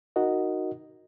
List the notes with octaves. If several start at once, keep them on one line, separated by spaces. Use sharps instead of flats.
D#4 F#4 A#4 D#5